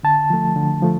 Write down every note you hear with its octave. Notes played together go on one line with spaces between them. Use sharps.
D3 A5
F3 A3
D3
F3 A3